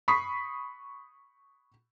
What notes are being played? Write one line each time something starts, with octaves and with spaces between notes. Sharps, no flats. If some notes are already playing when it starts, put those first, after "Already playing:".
B5 C#6 D#6 B6 C7